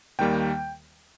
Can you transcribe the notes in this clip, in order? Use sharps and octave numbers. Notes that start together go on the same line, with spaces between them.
D#2 D#3 G3 A#3 G5